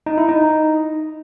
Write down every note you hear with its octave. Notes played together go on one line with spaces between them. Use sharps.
D#4
E4
D#4